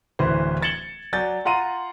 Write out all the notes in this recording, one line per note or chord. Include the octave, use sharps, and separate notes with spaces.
D1 D2 E3 B4 C5
G#6 A6 C#7 E7 F#7 G7
F#3 D5 G#5 G6 A6
F4 F#5 A#5 C6 D#7